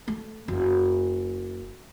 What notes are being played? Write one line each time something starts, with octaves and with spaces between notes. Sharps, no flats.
A3
F#1